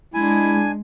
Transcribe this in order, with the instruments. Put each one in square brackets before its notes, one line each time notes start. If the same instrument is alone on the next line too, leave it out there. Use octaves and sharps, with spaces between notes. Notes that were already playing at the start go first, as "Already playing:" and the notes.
[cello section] G#3 [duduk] D4 [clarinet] E4 [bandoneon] G#5